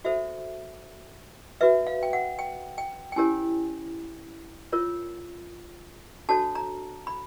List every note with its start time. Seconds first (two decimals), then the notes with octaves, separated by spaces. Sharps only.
0.05 F#4 A4 C5 E5
1.61 F#4 B4 E5
1.87 F5
2.03 G5
2.13 F#5
2.39 G5
2.78 G5
3.12 G5
3.16 C#4 E4 G4 A#4 C#5 G#5
4.72 F4 A#4 C#5
6.29 D4 F#4 A4 C#5 A5
6.55 A#5
7.07 B5